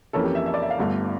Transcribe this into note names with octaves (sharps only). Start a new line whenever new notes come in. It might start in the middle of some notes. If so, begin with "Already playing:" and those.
F2 E3 A#3 C#4 A4
G4
E5
E5
D5
E5
F5
G1 G2 D3 A3